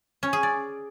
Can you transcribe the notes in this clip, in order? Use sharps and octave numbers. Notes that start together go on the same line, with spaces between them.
C#4
G#4
D5